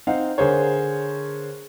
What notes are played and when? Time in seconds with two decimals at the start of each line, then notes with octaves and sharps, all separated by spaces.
0.07 C4 D#4 F5 F#5
0.38 D3 G#4 A#4 C5 C#5